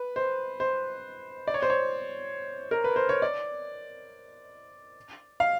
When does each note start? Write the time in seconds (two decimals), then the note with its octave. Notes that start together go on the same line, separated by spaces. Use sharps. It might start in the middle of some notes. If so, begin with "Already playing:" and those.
Already playing: B4
0.16 C5
0.60 C5
1.47 D5
1.54 C#5
1.62 C5
1.70 C#5
2.71 A#4
2.84 B4
2.96 C5
3.09 C#5
3.22 D5
5.40 F5